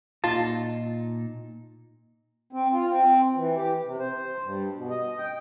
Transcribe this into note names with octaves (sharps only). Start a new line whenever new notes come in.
A#2 D#4 F4 A5
C4
F4
C4
E3
G4
C3
C5
G2
B2
D#5
G5